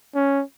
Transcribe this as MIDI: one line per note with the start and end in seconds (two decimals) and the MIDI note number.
0.15 0.42 61